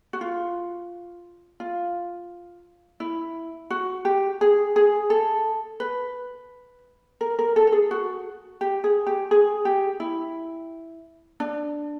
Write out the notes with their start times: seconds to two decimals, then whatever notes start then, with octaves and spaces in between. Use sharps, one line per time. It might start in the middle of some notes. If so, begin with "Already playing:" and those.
0.13 F#4
0.21 F4
1.60 F4
3.00 E4
3.70 F#4
4.05 G4
4.41 G#4
4.76 G#4
5.10 A4
5.80 B4
7.21 A#4
7.39 A#4
7.56 A4
7.67 A4
7.72 G#4
7.91 F#4
8.61 G4
8.84 G#4
9.07 G4
9.31 G#4
9.65 G4
10.00 E4
11.40 D4